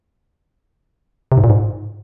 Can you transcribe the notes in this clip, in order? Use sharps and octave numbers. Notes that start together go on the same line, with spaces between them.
C3
G#2
A#2
G#2